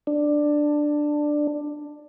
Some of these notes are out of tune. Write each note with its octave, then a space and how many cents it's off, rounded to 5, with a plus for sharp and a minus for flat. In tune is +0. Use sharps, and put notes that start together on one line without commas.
D4 +10